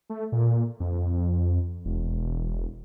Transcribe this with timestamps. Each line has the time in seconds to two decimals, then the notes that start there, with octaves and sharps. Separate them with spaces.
0.10 A3
0.32 A#2
0.80 F2
1.85 E1